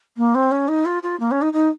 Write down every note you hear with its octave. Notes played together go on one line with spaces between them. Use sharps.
A#3
C4
C#4
D#4
F4
F4
A#3
C#4
D#4
D#4